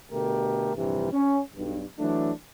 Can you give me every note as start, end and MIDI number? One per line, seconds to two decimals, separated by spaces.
0.12 0.71 47
0.12 0.71 50
0.12 0.71 57
0.12 0.71 67
0.12 0.71 70
0.76 1.09 34
0.76 1.09 43
0.76 1.09 48
0.76 1.09 52
0.76 1.09 55
1.12 1.39 61
1.56 1.84 35
1.56 1.84 43
1.99 2.31 52
1.99 2.31 54
1.99 2.31 57
1.99 2.31 62